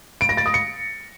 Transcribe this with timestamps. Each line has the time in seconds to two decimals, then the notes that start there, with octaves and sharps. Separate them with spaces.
0.21 D7
0.29 A#6
0.37 A6
0.46 D#6
0.54 C#7